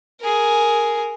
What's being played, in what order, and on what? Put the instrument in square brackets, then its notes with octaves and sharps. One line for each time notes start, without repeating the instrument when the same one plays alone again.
[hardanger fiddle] G#4 A#4